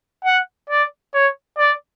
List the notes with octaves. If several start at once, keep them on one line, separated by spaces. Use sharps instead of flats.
F#5
D5
C#5
D5